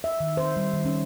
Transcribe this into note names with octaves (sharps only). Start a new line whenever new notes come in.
E5
D#3
C5
G3
D#3
C#4